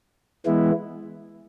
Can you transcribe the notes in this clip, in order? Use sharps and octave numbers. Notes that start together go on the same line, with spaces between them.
E3 G#3 B3 E4